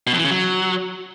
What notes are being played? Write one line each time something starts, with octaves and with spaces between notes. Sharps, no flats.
B2
F2
E3
C#3
F#3